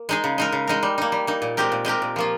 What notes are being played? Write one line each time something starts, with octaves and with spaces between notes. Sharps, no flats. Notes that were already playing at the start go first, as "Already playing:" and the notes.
Already playing: A#3
G#3 D#4 G#4
C#3
G#3 D#4 A#4
C#3
G#3 D#4 A#4
G3
A#3 D#4
G3
A#3 D#4
A#2
G#3 C4 G4 A#4
A#2
G#3 C4 G4 A#4
A#2
F3 A#3 F4